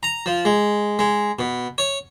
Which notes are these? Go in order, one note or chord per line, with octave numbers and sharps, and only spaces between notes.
A#5
F3
G#3
G#3
B2
C#5